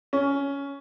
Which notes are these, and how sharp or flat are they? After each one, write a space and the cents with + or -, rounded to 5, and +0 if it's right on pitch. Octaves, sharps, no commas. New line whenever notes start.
C#4 +10